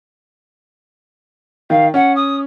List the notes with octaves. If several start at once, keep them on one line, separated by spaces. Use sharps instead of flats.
D#3 F5
C#4 F#5
D#6